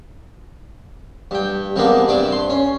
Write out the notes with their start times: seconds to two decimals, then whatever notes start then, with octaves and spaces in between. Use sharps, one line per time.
1.31 G2 G5
1.76 C3 G3 G#3 A#3 B3 D4
2.08 G2 C3 D4 B4 D6
2.32 C6
2.50 C#4